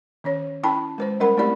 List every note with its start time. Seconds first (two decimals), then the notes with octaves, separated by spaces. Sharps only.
0.24 D#3 C#4 C#5
0.63 C#4 E4 G5 A5 B5
0.98 G#3 B4 C5
1.20 G3 C#4 A#4 F#5 B5
1.37 A3 C4 E4 G4 D5 B5